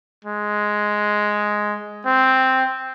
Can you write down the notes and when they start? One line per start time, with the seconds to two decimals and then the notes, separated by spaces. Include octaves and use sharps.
0.24 G#3
2.06 C4